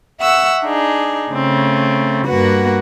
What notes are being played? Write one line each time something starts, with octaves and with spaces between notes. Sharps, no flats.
E5 F#5 C#6 E6
D4 D#4 G#4
C#3 A3 C4
G2 A#3 F#4 B4 F#5